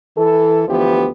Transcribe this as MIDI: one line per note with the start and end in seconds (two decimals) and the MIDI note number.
0.17 0.64 52
0.17 0.64 69
0.68 1.08 38
0.68 1.08 52
0.68 1.08 53
0.68 1.08 59
0.68 1.08 67